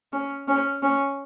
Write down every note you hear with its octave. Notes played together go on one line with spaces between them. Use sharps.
C#4
C#4
C#4